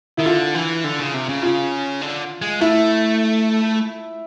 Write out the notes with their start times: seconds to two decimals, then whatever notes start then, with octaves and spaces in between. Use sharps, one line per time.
0.17 D#3 E4
0.26 D3 F4
0.55 E3
0.84 D3
0.99 C#3
1.14 C3
1.29 C#3
1.43 F4
2.02 D3
2.42 G#3
2.61 A3 E4